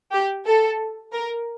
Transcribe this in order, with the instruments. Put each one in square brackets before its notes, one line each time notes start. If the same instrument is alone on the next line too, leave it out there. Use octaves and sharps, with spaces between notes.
[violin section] G4
A4
A#4